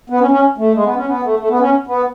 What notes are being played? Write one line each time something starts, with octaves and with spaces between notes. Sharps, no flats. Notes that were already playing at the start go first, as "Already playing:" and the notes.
B3
C#4
C#4
A3
G#3
B3
C#4
B3
A3
A3
B3
C#4
B3